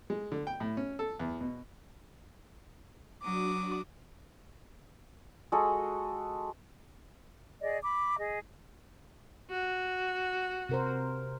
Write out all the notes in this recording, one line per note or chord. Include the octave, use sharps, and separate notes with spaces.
G#3
D3
G5
A2
C#4
A4
E2
B2
F#3 D4 F#4 D6 D#6
G#3 F#4 A4
G#4 D5 D#5
B5 D6
G#4 D#5
F#4
C3 A#4 C5